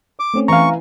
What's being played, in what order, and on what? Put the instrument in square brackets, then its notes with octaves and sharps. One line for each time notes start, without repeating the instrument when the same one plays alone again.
[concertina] D6
[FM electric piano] A3 C4 C#4
[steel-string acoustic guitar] E3 G#5 [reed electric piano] F5 A#5 [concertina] C#6